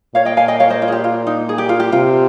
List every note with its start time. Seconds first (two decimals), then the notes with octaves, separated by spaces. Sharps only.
0.15 A#2 C#5 F5
0.25 D#5 G5
0.37 F5 G#5
0.48 D#5 G5
0.60 C#5 F5
0.70 C5 D#5
0.82 F4
0.88 G#4
0.92 G4
1.04 F4
1.27 D#4
1.49 G#4
1.58 G4
1.69 F4
1.80 G4
1.92 C3 F4